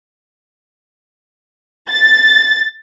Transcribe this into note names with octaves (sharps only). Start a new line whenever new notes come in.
A6